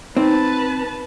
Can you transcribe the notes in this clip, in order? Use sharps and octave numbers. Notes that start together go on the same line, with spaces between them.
C4 D#4 B4 A5